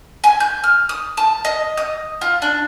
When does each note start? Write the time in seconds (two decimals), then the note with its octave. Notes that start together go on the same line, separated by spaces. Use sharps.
0.24 G#5
0.40 G6
0.64 F6
0.89 D#6
1.17 A5
1.45 D#5
1.77 D#6
2.21 F4
2.42 D4